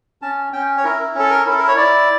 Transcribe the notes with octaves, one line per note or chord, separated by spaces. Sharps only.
C#4 A5
C#4 G5
C#5
E4 A#4
C#4 A4
A#4
E4 A4
A#4
C#5
E4 D5